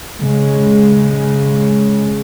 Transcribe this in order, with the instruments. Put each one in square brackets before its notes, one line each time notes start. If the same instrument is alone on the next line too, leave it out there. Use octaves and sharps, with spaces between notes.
[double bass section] C#3 G#3